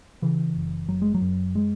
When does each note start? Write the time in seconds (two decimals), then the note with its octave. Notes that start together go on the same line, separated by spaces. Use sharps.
0.22 C#3 E3
0.56 F#1
0.88 F#1 F#3
1.02 G#3
1.14 F#3
1.21 F#2
1.55 G#3